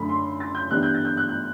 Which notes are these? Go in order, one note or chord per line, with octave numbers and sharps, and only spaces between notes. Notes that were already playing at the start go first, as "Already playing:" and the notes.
Already playing: F#2 D3 A3 B5
C6
A6
G6
G2 E3 G3 B3 D4 F#6
G6
A6
G6
F#6
G6